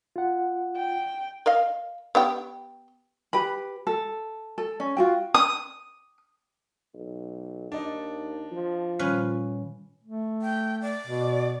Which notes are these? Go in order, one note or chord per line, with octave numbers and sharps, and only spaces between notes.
F4 F#5
G5
A#4 D#5 F5
B3 G4 G5
G4 B4 B5
A4
A4
C#4
F4 F#4 G5
D#6
B1
D#2 D4 D#4
F3
A#2 D#3 G3 C#4 B4 F5
A3
G5
D5
B2